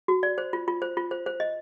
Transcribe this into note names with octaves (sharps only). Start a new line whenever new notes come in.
F#4
D5
C5
F4
F4
C5
F4
C5
C5
D#5